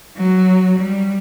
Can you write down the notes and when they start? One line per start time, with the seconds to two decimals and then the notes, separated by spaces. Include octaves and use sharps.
0.17 F#3
0.78 G3